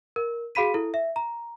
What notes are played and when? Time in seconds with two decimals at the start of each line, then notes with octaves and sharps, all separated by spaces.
0.16 A#4
0.55 F#4 G#4 F5 B5 B6 D#7
0.74 E4 A4
0.94 E5
1.16 A#5